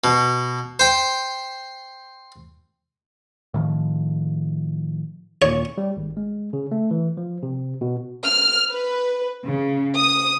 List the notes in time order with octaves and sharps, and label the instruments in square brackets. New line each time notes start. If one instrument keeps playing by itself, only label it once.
[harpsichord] B2
C5 G5
[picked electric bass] A2 D#3 F3
[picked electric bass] D#2 A#2 [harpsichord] C#5
[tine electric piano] G3
G#1
G#3
C#3
A3
E3
F3
C3
B2
[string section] F6
B4
C#3
D#6